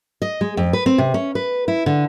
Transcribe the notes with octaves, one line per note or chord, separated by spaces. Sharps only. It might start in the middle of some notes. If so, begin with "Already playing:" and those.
D#5
G#3
F2
B4
C4
C3
C#4
B4
E4
D3